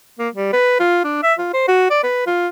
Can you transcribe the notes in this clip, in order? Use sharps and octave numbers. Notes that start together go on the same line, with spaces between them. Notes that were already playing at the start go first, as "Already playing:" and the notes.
A#3
G3
B4
F4
D4
E5
F4
C5
F#4
D5
B4
F4